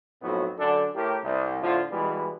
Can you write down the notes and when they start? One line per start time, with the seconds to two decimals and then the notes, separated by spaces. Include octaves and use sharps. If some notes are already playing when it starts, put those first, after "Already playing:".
0.22 B1 F2 A2 F#3 B3 F#4
0.58 F#2 D3 D4 A4
0.95 A2 G4 A#4
1.24 C2
1.61 A2 D3 F3 F4
1.91 B2 E3 G3 G#3